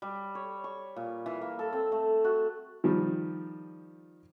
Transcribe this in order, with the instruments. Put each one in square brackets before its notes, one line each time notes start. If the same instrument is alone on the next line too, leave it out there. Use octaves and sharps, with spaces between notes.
[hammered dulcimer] G3
C#5
C#6
A#2
E3
A#3
A4
C4
A3
F#4
[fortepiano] D#3 F3 G3